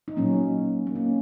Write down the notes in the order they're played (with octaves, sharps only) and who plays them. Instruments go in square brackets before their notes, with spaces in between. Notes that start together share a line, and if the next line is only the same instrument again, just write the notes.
[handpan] D#4
A#2 F#3 A#3 C#4
A#3
C#4